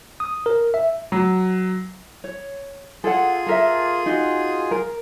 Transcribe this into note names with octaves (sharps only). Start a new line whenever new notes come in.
D#6
A#4
E5
F#3
C#5
F4 G#4 A4 F#5
A4 A#4 E5
D#4 F#4
A#4